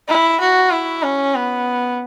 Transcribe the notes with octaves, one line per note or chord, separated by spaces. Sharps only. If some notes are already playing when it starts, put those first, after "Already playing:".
E4
F#4
E4
C#4
B3